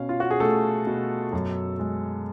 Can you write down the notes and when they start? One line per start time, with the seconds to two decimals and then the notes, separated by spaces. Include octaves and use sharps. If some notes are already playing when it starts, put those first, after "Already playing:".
Already playing: B2 C#4 F5
0.09 F4
0.20 F#4
0.31 G#4
0.40 A3 A4
0.87 B2
1.33 F#2
1.79 G#3